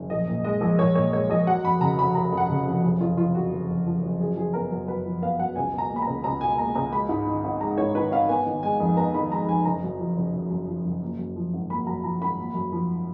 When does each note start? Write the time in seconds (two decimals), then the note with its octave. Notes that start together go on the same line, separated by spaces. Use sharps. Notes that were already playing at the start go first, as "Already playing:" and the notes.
Already playing: F#1
0.10 A#1 D#5
0.28 A#2
0.44 G#3 D#5
0.61 A#1
0.79 A#1 C#5
0.95 A#2 C#5
1.13 G#3 C#5
1.30 A#1 D#5
1.47 F#3 F#5
1.64 F2 B5
1.81 C#3 A#5
1.98 F1 B5
2.15 F#3 A#5
2.32 F2
2.37 F#5
2.50 C#3
2.67 F1
2.83 F#1
3.00 F2 F4
3.17 F3 F4
3.34 F#1 F#4
3.52 F#1
3.68 F2
3.86 F3
4.02 F#1
4.20 F#2 G#4
4.36 F3 G#4
4.53 B3 A#4
4.71 F#2 A#4
4.88 F#2 B4
5.04 F3
5.22 B3 F5
5.40 F#2 F#5
5.56 C#2 G#5
5.73 B2
5.78 A#5
5.90 A#3
5.96 B5
6.02 A#5
6.07 C#2
6.24 C#2 A#5
6.41 B2 G#5
6.58 A#3 A#5
6.75 C#2 A#5
6.93 G#3 B5
7.09 G#2
7.27 D#3
7.44 G#1
7.61 G#3 A#5
7.78 G#2 C#5
7.95 D#3 B4
8.11 G#1 F5
8.29 B3 G#5
8.46 D#3
8.63 G#3 G#5
8.80 F2
8.97 B3 A#5
9.14 D#3 B5
9.31 G#3 A#5
9.48 F2 G#5
9.65 F#1 A#5
9.83 F#2
9.99 F3
10.17 F#1
10.34 F#1
10.50 F#2
10.68 F3
10.85 F#1
11.02 A#3
11.19 F#2
11.36 F3
11.54 G#1
11.70 A#3 B5
11.87 F#2 A#5
12.04 F3 A#5
12.21 G#1 B5
12.39 A#3
12.55 F#2
12.72 F3